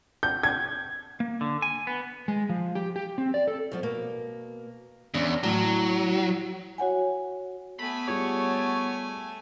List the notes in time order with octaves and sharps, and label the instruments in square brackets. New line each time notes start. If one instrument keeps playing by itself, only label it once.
[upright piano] G6
G#6
[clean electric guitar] A#3
D3
G#5
B3
[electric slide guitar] G#3
F3
G4
G4
C4
D5
A4
[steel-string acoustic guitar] F#2 F3 B3
B2 A#3
[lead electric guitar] E2 [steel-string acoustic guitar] C#4 D4
[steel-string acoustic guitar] A2 [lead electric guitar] F#3
[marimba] F#4 C#5 F#5 G#5
[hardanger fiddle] A3 G#5 [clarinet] B3 [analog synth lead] B5
[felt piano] G3 F4 G#4 [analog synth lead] C#5